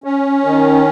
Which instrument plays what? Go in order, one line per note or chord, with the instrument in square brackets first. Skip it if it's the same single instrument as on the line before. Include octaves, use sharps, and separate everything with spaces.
[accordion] C#4
D#3